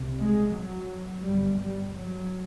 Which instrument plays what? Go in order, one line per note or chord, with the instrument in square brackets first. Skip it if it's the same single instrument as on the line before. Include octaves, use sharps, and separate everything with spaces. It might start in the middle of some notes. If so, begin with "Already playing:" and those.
Already playing: [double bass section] C2 C3
G#3
F#3
G1 G2 G3
G3
F#3